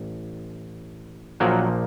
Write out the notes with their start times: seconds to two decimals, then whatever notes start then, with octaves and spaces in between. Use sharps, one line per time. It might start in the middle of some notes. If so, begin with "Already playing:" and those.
Already playing: A1
1.40 A#1 A#2 F3 F#3 A#3 F#4